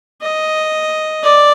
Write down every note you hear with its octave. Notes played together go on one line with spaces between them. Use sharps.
D#5
D5